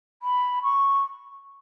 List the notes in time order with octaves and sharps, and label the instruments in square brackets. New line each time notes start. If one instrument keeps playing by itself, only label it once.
[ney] B5
C#6